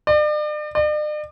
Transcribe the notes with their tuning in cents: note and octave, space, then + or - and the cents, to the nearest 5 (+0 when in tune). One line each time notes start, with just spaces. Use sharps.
D5 +40
D5 +45